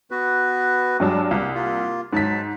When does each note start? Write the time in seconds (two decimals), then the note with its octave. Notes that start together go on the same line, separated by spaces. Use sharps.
0.11 B3 F#4 B4
1.00 G2 F#3 G#3 D4
1.31 C2 A#3
1.55 A#3 F4
2.13 G#2 F#3 A5 B6